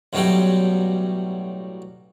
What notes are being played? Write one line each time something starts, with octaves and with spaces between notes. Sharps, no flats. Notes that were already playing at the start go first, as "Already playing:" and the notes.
A1 B2 F#3 G3 G4